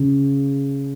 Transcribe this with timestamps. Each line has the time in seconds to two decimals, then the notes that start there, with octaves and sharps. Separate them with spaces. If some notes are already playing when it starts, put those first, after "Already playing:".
Already playing: C#3